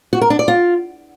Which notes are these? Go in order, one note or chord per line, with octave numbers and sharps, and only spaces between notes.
F#4
A#4
D4
D5
F4